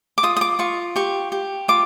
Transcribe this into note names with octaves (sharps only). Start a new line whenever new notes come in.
D6
F4 D#6
D#6
D6
F4 C#6
G4 C#6
G4
F4 D6